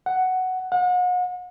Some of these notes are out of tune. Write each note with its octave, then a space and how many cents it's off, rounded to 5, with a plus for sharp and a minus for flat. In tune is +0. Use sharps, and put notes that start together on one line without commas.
F#5 +5
F#5 -40